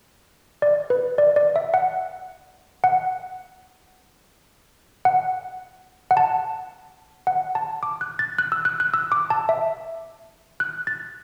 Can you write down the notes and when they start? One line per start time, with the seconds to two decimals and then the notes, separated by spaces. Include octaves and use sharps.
0.62 D5
0.90 B4
1.18 D5
1.36 D5
1.56 E5
1.74 F#5
2.84 F#5
5.05 F#5
6.11 F#5
6.17 A5
7.27 F#5
7.55 A5
7.83 D6
8.01 F#6
8.19 A6
8.38 F#6
8.52 E6
8.65 F#6
8.80 F#6
8.94 E6
9.12 D6
9.30 A5
9.49 E5
10.60 F#6
10.87 A6